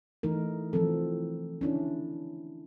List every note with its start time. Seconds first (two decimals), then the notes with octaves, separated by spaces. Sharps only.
0.23 E3 A3 D#4 A#4
0.73 E3 F3 C4 A4
1.61 C#4 D4 E4